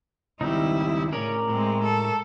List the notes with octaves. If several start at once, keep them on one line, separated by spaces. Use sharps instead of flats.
C#2 D#3 G3 C4 D#4 E4
A2 C#3 C#4 A#4 D5
A2 G#3 C4
A4